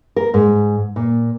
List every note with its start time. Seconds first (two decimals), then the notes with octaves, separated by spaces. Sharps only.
0.16 A#4
0.34 G#2
0.96 A#2